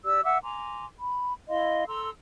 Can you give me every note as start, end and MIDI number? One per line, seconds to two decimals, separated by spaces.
0.05 0.21 67
0.05 0.21 74
0.05 0.21 88
0.24 0.38 76
0.24 0.38 78
0.24 0.38 86
0.24 0.38 88
0.43 0.85 80
0.43 0.85 82
0.43 0.85 84
0.43 0.85 86
0.98 1.32 83
1.49 1.84 64
1.49 1.84 75
1.49 1.84 77
1.49 1.84 84
1.87 2.09 69
1.87 2.09 82
1.87 2.09 84
1.87 2.09 88